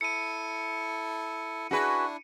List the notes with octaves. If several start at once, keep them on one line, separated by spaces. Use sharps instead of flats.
E4 A4 C#7 D#7
D4 E4 F#4 G#4 B4